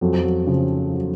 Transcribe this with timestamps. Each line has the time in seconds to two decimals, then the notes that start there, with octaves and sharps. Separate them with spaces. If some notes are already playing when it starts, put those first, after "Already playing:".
0.01 F2 F#3
0.13 F3
0.23 F#3
0.47 C#3 F3
0.93 F#3